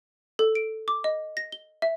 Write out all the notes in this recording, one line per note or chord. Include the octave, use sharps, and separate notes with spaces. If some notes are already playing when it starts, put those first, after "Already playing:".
A4
D7
D6
D#5
A#6
G7
E5